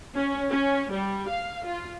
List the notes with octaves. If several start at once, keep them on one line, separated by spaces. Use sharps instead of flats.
C#4
C#4
G3
F5
F4